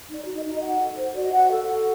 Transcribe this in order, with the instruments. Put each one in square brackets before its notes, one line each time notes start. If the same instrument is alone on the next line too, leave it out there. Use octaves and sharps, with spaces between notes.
[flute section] D#4
D5
F#4
D#5
D#4
D#5
F#4 F#5
A4
C5
F#4 D5
D#5
F#4 F#5
A4
F#4